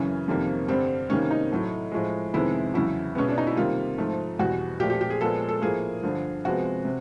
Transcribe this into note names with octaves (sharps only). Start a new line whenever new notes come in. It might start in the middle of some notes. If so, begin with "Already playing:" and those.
Already playing: F#2 C#3 E3 C#4
F2 C3 D#3 G3 A#3
G2 D3 G3 C4
C3 D#3 G3 A#3 C#4
D#4
A2 F#3 A3
A2 F3 G#3
F2 C3 D#3 G#3 B3 E4
E2 C#3 F#3 E4
B2 G#3 B3 C#4
D4
D#4
E4
C3 D#3 G3 A#3 F4
G#2 F3 A3
E2 B2 G3 F#4
A#2 F3 A3 G4
G4
G4
G#4
A#2 F3 G#3 B3 A4
A4
A2 F3 A#3 G#4
G2 D3 F3
C3 F3 G#3 B3 F#4
C3